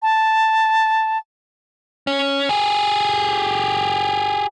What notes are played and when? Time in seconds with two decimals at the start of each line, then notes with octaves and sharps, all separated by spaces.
0.02 A5
2.07 C#4
2.49 G4 G#4